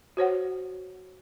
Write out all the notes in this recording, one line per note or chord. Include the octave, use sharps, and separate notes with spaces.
F#4 C5 C#5 F#5